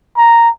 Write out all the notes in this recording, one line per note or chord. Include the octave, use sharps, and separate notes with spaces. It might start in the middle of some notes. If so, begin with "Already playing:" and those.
A#5